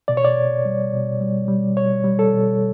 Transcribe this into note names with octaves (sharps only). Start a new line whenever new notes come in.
B2 D5
C#5
D5
B2
G3
B2
G3
G3
B2 C#5
G3
A4
B2